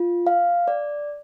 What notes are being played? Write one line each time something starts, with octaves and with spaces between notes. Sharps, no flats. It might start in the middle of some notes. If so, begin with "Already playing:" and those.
Already playing: F4
F5
D5